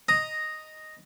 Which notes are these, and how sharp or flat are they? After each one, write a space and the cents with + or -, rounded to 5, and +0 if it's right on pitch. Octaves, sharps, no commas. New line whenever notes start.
D#5 +0 A#5 +0 D#6 +0